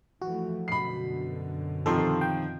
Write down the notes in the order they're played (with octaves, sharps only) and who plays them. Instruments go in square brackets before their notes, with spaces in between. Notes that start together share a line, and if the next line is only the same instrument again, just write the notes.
[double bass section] E3 F3 A3 [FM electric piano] F#4
[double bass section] F#2 B2 D3 [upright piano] B5 C7
[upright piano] C3 D#3 F3 [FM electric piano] A4 C6
[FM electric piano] G5